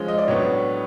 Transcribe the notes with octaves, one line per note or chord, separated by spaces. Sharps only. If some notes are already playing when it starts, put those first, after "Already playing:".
Already playing: F3 G#3 C#4
D#5
D5
A2 F#3 B3 D4 C#5